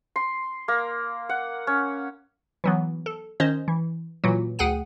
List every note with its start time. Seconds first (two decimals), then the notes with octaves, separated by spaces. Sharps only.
0.16 C6
0.68 A#3
1.29 F#5
1.67 C#4
2.64 E3 F#3 B3
3.06 A4
3.40 D#3 C#4 C5 D#5
3.68 E3
4.24 A#2 E3 F#3
4.59 D2 G#4 F#5 G5 D#7